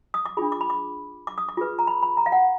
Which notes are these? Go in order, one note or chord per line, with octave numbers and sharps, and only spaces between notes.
D#6
D6
D4 F4 G#4 B5
D6
B5
D6
D6
D#6
D6
F4 G#4 B4
A#5
B5
B5
A#5
F5
F#5